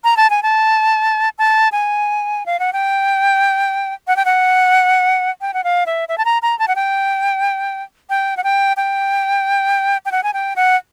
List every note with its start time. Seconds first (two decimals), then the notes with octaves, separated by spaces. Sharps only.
0.04 A#5
0.17 A5
0.30 G#5
0.43 A5
1.38 A5
1.72 G#5
2.46 F5
2.60 F#5
2.73 G5
4.08 F#5
4.16 G5
4.25 F#5
5.41 G5
5.54 F#5
5.64 F5
5.86 E5
6.09 E5
6.18 A5
6.25 A#5
6.42 A#5
6.59 A5
6.68 F#5
6.76 G5
8.10 G5
8.37 F#5
8.44 G5
8.77 G5
10.06 G5
10.12 F#5
10.23 G#5
10.34 G5
10.56 F#5